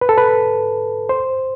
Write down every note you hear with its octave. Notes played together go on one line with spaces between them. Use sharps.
B4
A4
B4
C5